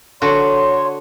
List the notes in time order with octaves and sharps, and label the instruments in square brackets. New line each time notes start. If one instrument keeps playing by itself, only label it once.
[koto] D3 F#4 [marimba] A4 [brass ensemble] C#5 [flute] C6